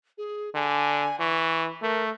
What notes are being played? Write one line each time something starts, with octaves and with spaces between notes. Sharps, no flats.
G#4
D3 G#5
E3 C#6
A3 A#4